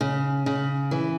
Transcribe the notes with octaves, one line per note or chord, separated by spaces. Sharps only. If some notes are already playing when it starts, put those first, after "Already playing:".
C#3
C#3
E3